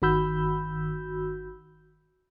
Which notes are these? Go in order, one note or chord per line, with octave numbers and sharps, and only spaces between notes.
G1 D#3 F#4 B5 E6 G6